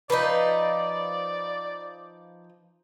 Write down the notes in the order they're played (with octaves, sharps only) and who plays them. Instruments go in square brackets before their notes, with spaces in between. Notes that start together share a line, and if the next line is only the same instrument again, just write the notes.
[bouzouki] F3 D#4 [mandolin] B4 B5 [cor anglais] D5